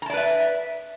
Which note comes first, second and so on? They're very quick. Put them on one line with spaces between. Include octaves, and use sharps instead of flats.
A#5 A5 D5 B4 E5